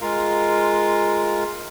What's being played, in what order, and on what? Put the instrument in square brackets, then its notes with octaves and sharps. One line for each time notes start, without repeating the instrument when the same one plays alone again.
[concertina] G#3 F4 A#4 F5